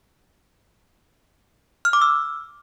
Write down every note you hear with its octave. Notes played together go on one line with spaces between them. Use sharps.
F6
D6
E6